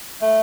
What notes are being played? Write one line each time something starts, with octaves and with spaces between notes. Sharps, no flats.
A3